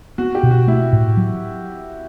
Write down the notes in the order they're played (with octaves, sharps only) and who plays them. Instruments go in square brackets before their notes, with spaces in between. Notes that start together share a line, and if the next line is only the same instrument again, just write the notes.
[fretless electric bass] B3 [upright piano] F#4
[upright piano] G4
[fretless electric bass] B2
[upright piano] F#4
[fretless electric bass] A3 [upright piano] E4
[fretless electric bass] A2
F#3